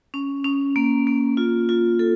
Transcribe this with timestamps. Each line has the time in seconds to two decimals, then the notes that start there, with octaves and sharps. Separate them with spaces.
0.14 C#4
0.44 C#4
0.76 A#3
1.07 A#3
1.37 F4
1.69 F4
1.99 A4